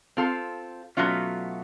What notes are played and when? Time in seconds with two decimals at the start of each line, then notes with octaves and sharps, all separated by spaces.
0.17 C4 F4 A4
0.97 B2 F#3 A3 C#4 F4